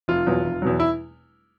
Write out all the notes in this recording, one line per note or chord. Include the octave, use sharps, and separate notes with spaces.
F1 F4
E2 B2 F#3
F1
E2 B2 F#3
E4